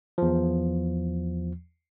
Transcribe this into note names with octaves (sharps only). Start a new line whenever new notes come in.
E2 F3